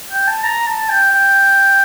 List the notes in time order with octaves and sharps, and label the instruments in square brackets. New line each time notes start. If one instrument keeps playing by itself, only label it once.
[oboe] G5
A5
A#5
A5
G5
G5